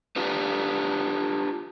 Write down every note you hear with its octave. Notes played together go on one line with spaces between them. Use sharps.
D4 F4 G4 B4